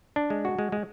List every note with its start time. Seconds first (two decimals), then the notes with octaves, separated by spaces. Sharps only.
0.16 D4
0.30 G#3
0.45 F#4
0.59 G#3
0.72 G#3